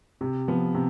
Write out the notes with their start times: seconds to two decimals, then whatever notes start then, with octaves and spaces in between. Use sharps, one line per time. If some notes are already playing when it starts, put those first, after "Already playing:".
0.21 C3
0.48 F3 B3
0.75 C3